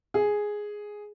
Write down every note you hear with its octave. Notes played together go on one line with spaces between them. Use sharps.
G#4